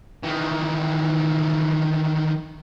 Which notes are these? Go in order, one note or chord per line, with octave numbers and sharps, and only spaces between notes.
D#3 E3